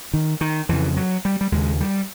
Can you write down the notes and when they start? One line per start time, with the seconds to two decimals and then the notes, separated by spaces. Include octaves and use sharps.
0.14 D#3
0.41 D#3
0.69 F2 C#3 E3
0.97 F#3
1.25 G3
1.41 G3
1.52 D#2 C#3 G#3
1.81 G3